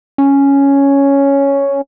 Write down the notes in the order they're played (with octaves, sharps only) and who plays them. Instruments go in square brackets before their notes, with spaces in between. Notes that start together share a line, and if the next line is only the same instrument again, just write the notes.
[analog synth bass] C#4